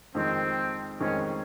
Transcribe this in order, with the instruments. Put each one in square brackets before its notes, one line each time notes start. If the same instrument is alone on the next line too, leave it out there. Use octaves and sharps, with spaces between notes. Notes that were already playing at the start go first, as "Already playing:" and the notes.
[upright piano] F2 D#3 G#3 [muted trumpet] C4
[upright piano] F2 D#3 G#3 [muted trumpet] C#4